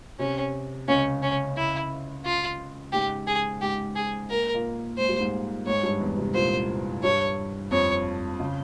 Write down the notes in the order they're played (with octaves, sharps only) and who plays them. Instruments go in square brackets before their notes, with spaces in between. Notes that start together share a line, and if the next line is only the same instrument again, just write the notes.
[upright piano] C3 [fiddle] C#4
[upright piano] C#2 C#3 [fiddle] C#4
[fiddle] C#4
E4
F4
[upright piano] G#2 G#3 [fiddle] G4
[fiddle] G#4
[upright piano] G#2 G#3 [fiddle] G4
[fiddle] G#4
[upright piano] A#3 [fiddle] A#4
[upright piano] A#2 A#3
[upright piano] G#3 [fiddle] C5
[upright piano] G3
G#2 G#3
[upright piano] G#2 G#3 [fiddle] C#5
[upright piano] G2 G3
E2 E3
C3
[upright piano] A#2 [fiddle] C5
[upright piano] G2 G3 [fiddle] C#5
[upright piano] F2 F3 [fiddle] C#5
[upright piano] C#3